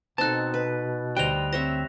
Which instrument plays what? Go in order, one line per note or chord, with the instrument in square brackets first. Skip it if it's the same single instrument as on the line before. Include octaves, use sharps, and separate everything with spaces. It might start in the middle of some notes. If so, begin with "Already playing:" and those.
[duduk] B2 [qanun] C4 D#4 A4 [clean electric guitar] A5 [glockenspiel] F#6 A6
[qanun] B4
[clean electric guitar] D2 G5 [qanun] G3 C5 D#5 [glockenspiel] F#6 F7
[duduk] C4 [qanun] C5 C#5 E5 [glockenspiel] A#6